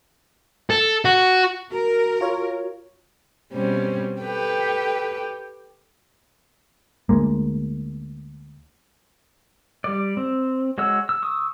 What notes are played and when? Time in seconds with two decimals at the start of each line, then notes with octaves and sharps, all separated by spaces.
0.70 A4
1.05 F#4
1.71 F#4 A#4
2.21 F4 C#5
3.53 B2 G3 C4 C#4
4.21 G4 A4 B4 G5
7.09 D2 G#3 A#3
9.84 G3 D5
10.17 C4
10.78 G#3 F#4 C#5 E6
11.09 E6
11.22 C#6 D#6 E6